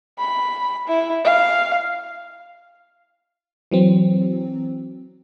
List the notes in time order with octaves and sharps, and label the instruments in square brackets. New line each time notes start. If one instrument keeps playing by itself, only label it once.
[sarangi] B5
E4
F5
[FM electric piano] E3 F#3 C4